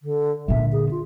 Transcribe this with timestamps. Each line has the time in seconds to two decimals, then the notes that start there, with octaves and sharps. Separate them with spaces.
0.02 D3
0.48 A#2 D3 E5
0.72 G#4
0.91 F4